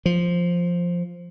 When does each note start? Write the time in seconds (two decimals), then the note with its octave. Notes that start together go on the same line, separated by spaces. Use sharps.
0.06 F3